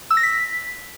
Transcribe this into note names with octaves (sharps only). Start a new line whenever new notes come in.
E6
A#6
B6